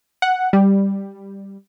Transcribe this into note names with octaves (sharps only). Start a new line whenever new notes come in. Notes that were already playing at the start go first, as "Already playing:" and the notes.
F#5
G3